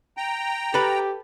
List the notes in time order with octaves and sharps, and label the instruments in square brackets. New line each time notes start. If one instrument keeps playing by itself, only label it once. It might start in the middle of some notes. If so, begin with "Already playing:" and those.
[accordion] G5 A#5
[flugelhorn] G4 [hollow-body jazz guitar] A4 B4